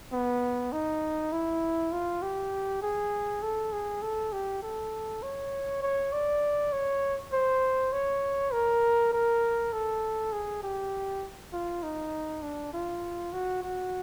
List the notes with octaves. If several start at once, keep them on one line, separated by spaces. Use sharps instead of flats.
B3
D#4
E4
F4
G4
G#4
A4
G#4
A4
G4
A4
C#5
C#5
D5
C#5
C5
C#5
A#4
A#4
A4
G#4
G4
F4
D#4
D4
F4
F#4
F#4